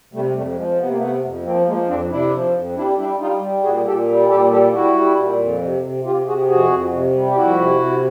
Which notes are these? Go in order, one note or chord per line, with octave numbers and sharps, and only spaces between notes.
C3 G3 A3
F2 G3 A3
F3 G#3
C3 B3
A#3
C3 A3 B3
F2
F3 A#3 C4
F3 G#3 A#3
F2 C4 D4
C3 D4 E4
F3
F2
G3 D4 E4
G3 D4 E4
G3 D#4 F4
G3
A#2 F#4 G#4
A#2 G4 A4
G3
A#2 G4 A4
G3 G4 A4
G3 E4 F#4
G3
A#2
F2
C3
C3
C3 F4 G4
C3 F#4 G#4
F2 F#4 G#4
F2
C3
G3
G4
F2 E4 F#4
C3
C3